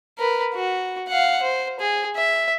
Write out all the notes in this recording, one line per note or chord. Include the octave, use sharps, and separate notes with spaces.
A#4 B4
F#4
F5 F#5
C5
G#4
E5